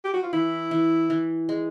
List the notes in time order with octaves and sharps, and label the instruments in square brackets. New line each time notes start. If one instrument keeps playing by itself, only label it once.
[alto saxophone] G4
F#4
F4
[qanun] E3 [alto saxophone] E4
[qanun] E3
E3
G#3